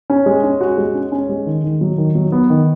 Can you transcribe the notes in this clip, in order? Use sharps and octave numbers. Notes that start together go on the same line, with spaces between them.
C#4
G#3
C#4
F#4
G#3
C#4
C#4
G#3
D#3
D#3
F#3
D#3
F#3
B3
D#3